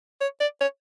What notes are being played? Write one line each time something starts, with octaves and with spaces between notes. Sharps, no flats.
C#5
D5
C#5